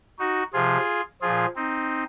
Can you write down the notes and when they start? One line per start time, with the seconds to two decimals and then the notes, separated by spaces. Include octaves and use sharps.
0.19 D#4 F#4
0.53 C3 F3 F4 G#4
1.21 A#2 F3 F4 G#4
1.56 C4 D#4